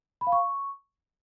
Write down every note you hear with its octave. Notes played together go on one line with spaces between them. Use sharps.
B5
F5
C#6